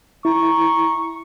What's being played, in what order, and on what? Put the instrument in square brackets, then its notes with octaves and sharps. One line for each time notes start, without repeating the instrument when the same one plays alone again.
[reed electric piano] E4 [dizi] A#5 [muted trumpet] C#6